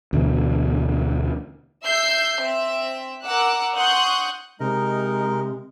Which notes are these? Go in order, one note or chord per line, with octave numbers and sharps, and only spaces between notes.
D2 B2 E3
E5 E6 G6 C7
C4 E5
A#4 F#5 D6 E6 F#6
F#5 C6 C#6 D#6 F#6 G6
C3 G#3 D#4 A#4 D#5